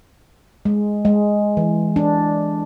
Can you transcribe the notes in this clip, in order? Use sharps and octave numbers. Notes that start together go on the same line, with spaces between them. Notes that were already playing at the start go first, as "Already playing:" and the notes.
G#3
G#3
E3
D4